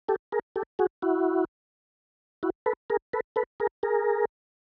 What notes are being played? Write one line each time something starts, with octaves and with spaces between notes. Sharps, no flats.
G4 A4
G#4 A#4
G4 A4
F#4 G#4
E4 F#4
E4 F#4
A4 B4
G#4 A#4
A4 B4
A4 B4
G#4 A#4
G#4 A#4